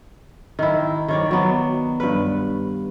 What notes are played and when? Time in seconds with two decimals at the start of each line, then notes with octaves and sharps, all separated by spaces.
0.59 D#3 E4
1.08 D#3 C#5 D5
1.31 F#3 B3
2.00 G2 B4